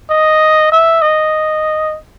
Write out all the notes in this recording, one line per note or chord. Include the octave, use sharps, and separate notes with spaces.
D#5
E5
D#5